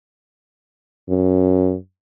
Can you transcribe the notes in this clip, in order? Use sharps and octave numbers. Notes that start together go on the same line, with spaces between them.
F#2